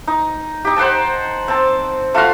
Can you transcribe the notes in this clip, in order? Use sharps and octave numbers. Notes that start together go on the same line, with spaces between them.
D#4
D#4 G4
C5 F#5 G5 A5
C4 A5
A3 F4 F#4 F5